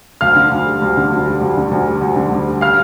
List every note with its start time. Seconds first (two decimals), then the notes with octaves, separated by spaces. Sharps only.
0.21 D2 F5 F6
0.36 D3
0.51 D2
0.66 G3
0.82 D2
0.97 D3
1.12 D2
1.26 G3
1.42 D2
1.57 D3
1.71 D2
1.86 G3
2.01 D2
2.16 D3
2.32 D2
2.47 G3
2.61 F5 F6